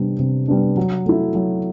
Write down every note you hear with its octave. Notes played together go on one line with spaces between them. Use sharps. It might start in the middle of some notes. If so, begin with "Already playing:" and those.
Already playing: C3 G3 B3 D4
C3
G3 B3 D4
F#3
A3 E4
F#3